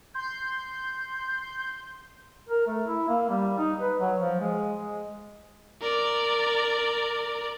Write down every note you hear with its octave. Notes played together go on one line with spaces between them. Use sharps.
C6 G6
A#4
A3
E4
A#3
G3
D#4
B4
F#3
F3
G#3
G#3
A#4 D5